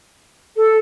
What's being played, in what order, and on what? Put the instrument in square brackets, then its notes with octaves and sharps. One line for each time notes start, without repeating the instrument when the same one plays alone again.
[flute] A4